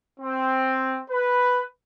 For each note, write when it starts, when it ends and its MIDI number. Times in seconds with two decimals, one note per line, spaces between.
0.20 0.99 60
1.11 1.62 71